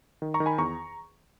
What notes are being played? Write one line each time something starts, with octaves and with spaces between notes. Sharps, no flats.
D#3
A#5 C#6
D#3
G#5 B5
E2 A#5 C#6